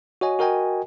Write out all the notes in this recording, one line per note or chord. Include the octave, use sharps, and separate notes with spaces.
F#4 C#5 D#5 G#5
F#4 A#4 D#5 G5 G#5